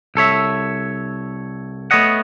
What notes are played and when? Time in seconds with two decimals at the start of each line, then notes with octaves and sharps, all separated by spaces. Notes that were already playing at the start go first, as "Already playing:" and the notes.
0.15 C2 A4 C#5 E5
1.91 A3 B3 C#5 D#5 F#5